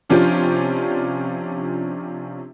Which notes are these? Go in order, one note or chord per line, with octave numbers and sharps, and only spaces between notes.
C3 F3 C#4 D4 F4 G4